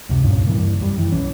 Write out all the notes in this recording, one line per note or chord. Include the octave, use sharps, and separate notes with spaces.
C#2 F#2 C3
C2 G2 A#2 C#3
G2 E3 A#3
F#2 G3
E3
B1 E3 C#4